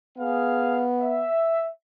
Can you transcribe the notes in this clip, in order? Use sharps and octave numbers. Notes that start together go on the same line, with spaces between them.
B3 G#4 F5
E5